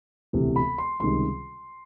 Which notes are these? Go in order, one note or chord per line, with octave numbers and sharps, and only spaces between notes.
E1 D2 C3 E3
B5
C6
C#2 C3 D#3 G3 C6